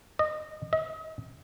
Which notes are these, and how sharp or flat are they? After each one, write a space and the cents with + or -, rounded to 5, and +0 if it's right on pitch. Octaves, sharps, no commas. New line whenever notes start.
D#5 -20
D#5 +40